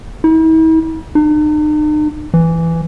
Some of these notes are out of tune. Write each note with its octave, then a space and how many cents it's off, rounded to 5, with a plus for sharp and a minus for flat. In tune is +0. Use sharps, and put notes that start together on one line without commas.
E4 -45
D#4 -45
E3 +10